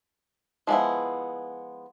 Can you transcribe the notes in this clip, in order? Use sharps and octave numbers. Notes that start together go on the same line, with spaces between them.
F3 G#3 B3 E4